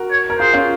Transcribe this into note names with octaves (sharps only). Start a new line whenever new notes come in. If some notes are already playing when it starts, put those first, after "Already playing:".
Already playing: F#4 A#4
C#5
A#4
F4 G#4 C5
C#4 F4